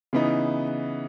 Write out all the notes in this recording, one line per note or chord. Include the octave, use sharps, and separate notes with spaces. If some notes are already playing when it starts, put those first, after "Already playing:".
C#3 E3 B3 D#4